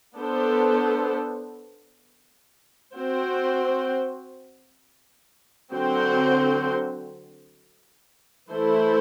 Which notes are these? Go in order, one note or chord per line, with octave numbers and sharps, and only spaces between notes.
B3 D4 A4 C5
C4 F#4 C5
D3 F#3 C4 F#4 C5
E3 A3 E4 A4 C5